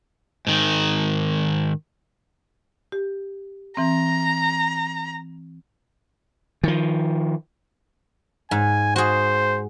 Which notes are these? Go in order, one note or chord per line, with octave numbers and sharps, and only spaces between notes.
G#2 D#3
G4
E3 C4 A#5
D#3 F3
G#2 G#5
F#4 G#4 C5